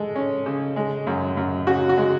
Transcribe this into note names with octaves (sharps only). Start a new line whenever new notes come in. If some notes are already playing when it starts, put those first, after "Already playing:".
Already playing: G#3 A4
C#4
C#3
G#3
F#2
F#2
C#3 F#4
F#4
G#3